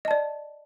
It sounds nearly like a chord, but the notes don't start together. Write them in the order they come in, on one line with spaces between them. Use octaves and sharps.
D#5 A5 D5